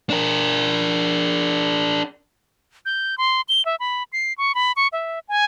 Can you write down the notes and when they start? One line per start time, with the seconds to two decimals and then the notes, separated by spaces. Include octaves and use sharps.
0.10 D4 A#4
2.85 G6
3.18 C6
3.49 G7
3.65 E5
3.80 B5
4.13 C7
4.38 C#6
4.55 B5
4.76 C#6
4.93 E5
5.29 G#5